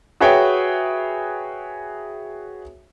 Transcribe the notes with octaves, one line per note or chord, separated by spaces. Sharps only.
F#4 G#4 B4 C#5 E5 G5